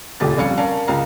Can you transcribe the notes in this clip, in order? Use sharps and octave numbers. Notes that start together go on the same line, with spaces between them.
D#1 C#2 A3 G4 A6
F1 G3 C#4 F5 C#7
C#4 A#4 D5 F5 A5
C#2 F5 A#5